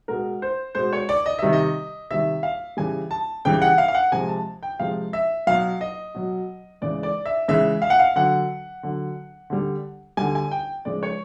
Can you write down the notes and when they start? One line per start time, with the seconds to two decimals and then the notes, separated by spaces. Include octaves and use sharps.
0.08 B2 G#3 A#4
0.42 C5
0.75 B2 G#3 C5
0.93 C#5
1.09 D5
1.26 D#5
1.39 C3 D#3 G3 E5
1.53 D#5
2.11 C3 D#3 G3 E5
2.43 F5
2.77 C#3 E3 G3 G#5
3.11 A5
3.45 C#3 E3 G3 G5
3.62 F#5
3.78 F5
3.88 F5
3.95 F#5
4.12 C3 F3 G#3 G#5
4.29 A5
4.63 G5
4.79 C3 F3 G#3 F5
5.13 E5
5.47 B2 F#3 F5
5.81 D#5
6.14 B2 F#3
6.81 C#3 E3 G#3 D5
7.03 D5
7.26 E5
7.48 C#3 E3 G#3 E5
7.82 F5
7.90 F#5
7.99 F5
8.16 D3 F#3 F#5
8.83 D3 F#3
9.50 D3 G3
10.17 D3 G3 G#5
10.35 G#5
10.51 G5
10.85 C#3 F3 G#3 D5
11.03 C#5